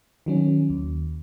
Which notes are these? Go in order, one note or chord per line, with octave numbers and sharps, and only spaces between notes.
D#3 F#3 C#4
D#2